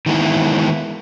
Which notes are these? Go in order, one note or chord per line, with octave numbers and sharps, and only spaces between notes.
D#3 E3 G#3 A#3 B3 E4